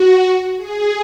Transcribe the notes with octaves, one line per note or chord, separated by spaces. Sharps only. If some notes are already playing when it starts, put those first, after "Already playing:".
Already playing: F#4
G#4